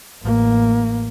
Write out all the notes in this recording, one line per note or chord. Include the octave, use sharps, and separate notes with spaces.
A1 A#3